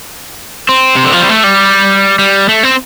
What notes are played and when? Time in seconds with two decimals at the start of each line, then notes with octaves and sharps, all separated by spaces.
0.69 C4
0.96 C3
1.04 D3
1.13 F3
1.20 G3
1.29 A3
1.44 G3
2.19 G3
2.49 A3
2.63 C4